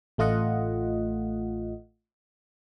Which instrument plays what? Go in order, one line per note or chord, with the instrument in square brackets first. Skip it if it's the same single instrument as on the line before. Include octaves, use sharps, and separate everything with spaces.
[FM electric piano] A1 A3 F4 D#5 F#5